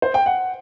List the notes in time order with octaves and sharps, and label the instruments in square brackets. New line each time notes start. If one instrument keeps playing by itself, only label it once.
[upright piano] C5
G5
F#5